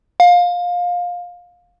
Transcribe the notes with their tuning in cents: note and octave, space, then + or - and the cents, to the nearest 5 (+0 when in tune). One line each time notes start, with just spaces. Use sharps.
F5 +20